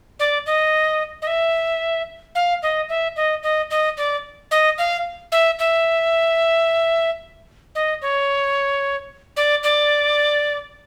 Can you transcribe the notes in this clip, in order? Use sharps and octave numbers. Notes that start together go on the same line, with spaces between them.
D5
D#5
D#5
E5
F5
D#5
E5
D#5
D#5
D#5
D5
D#5
F5
E5
E5
D#5
C#5
D5
D5